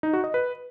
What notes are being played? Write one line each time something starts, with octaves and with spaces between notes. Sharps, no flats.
D#4
F#4
D#5
B4